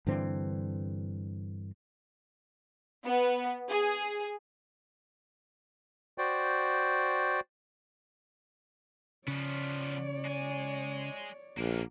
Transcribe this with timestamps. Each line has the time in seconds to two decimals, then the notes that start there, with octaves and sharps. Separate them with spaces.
0.07 G2 D3 E3 C4
3.05 B3
3.71 G#4
6.18 F#4 C5 D5 G5
9.28 C#3 F3 B3 C#5 D5
10.25 G#3 G#5
11.57 A#1 A#3 D4